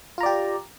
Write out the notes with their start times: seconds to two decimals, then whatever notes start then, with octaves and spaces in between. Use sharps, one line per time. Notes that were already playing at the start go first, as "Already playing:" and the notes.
0.18 F4
0.21 A#5
0.23 D5
0.26 G4